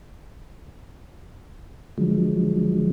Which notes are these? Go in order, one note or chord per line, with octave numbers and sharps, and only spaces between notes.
D3 F3 F#3 G#3